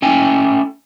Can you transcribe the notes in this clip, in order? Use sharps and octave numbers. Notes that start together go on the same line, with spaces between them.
A3 C#4 G5 G#5